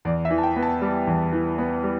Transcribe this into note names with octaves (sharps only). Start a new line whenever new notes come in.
E2 D5
E5
E3
A5
G5
B3
A5
G3
E2
E3
B3
G3